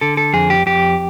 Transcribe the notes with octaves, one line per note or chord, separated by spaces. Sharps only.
D3 A4
A4
F2 G#4
G4
F2 G4